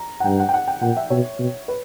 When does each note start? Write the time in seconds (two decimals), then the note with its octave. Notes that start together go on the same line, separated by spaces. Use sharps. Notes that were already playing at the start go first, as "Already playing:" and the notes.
Already playing: A#5
0.20 F#5
0.24 G2 G5
0.40 F#5
0.49 G5
0.54 F#5
0.68 G5
0.82 A#2 F#5
0.97 E5
1.10 B2 C#5
1.39 B2
1.68 B4